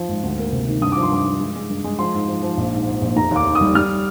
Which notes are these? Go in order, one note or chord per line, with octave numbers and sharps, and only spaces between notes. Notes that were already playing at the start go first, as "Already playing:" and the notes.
Already playing: F3
G#1
D2
A#3
C3
D#3
G2 D#6
F3 D6
C6
G2 D6
F3
G#3
G#3
G2
G#3
F3 C6
G#2
F3
F3
A#1
G#2
G#2
A#1
F1 A#5
D#2 D6
D#3
D#6
G3
G3 F6